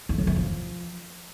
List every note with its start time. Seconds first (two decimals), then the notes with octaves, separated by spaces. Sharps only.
0.09 D#3
0.18 F#3
0.27 E3
0.36 F3